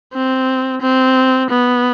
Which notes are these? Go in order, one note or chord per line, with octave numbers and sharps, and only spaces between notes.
C4
C4
B3